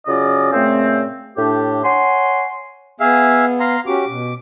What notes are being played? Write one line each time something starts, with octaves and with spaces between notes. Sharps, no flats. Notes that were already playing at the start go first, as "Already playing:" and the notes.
C#3 F#3 C#4 F4 D5 D#5
A#2 C#3 A3 C4
A2 D4 G4
C#5 F#5 G#5 C6
B3 G#4 E5 F5
F5 A#5 C6
C#4 F#4 G4 D6
B2